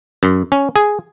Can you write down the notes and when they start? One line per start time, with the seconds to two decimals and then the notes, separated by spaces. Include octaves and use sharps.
0.23 F#2
0.52 C#4
0.76 G#4